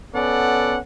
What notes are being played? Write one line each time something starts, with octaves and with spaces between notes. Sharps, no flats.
B3 C#4 A4 D5 F#5